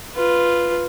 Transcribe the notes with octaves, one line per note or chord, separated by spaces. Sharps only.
F4 B4